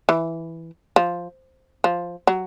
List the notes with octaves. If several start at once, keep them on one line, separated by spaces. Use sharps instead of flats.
E3
F3
F3
F#3